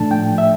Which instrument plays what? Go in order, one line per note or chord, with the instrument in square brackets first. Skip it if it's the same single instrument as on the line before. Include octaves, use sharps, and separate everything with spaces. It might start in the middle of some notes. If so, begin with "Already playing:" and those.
Already playing: [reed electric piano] A2 F3 A3 D4 A5
G5
E5